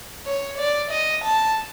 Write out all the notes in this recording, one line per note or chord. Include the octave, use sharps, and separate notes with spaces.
C#5
D5
D#5
A5